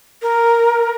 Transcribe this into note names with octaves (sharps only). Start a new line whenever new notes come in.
A#4